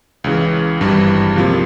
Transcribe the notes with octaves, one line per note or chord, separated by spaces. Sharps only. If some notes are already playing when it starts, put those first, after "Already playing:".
C#2 C#3 E3
G#1 G2 E3 G3
C#2 C3 F3 A#3 F4